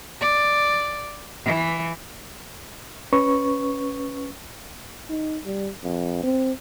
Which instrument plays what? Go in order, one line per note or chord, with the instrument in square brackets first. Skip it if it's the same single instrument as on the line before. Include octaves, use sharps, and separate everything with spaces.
[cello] D5
E3
[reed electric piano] C#4 B4 C#6
[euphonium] D#4
G3
F2
C4